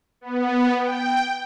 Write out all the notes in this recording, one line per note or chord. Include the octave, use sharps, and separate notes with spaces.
B3
G5